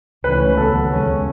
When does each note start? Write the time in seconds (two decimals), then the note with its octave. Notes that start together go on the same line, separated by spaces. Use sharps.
0.24 C#2 C#3 E3 A3 C#4 B4
0.57 D#2 C#3 F#3 B3 A4
0.91 C#2 C#3 G#3 C#4